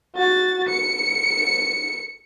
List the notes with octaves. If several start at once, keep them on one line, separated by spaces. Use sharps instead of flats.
F#4 A6
C#7